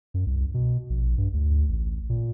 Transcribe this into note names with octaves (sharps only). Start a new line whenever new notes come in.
F#2
C2
B2
A#1
G2
D2
A1
A#2